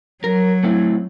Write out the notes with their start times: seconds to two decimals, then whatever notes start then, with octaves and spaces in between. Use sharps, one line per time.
0.24 F#3 A#4
0.63 A3 C4 E4